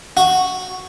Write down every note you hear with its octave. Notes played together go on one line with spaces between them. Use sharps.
F#4